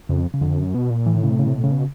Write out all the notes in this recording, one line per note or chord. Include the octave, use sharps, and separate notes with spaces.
F2 C#3
C#3
F2 D3
F#2
B2
A#2
A2 E3
D#3
C#3
C3
C#3
C3
B2
C#3
B2